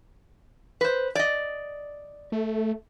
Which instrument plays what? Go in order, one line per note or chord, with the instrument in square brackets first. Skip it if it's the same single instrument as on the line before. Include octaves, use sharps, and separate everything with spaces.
[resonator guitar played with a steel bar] B4 C5
D5 D#5
[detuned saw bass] A3